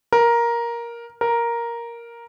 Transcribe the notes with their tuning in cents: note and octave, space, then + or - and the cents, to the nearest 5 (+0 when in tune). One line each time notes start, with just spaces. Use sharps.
A#4 +10
A#4 +5